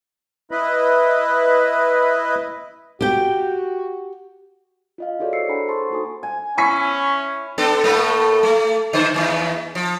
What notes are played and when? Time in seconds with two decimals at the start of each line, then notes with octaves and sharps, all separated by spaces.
0.51 E4 B4 D#5 B5
3.01 F#4 G4 G5
4.98 F4 D#5 F5
5.20 E4 F#4 G#4 A4 C#5 D5
5.33 F#4 C5 E6 C7 C#7
5.48 D4 A4 F#5 G#5 A#5 B5
5.68 C5 A5 C6 C#6
5.91 A#3 D#4 F#4 A4 G#5 D#6
6.23 G#5
6.58 C#4 E4 G#5 C#6 B6
7.58 B3 D4 A4
7.84 A2 A3 A#3
8.43 A3
8.93 D3 C5
9.14 D#2 G#2 E3
9.75 F3